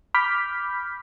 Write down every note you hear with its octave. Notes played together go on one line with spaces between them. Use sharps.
B5 D6 F6 G6 B6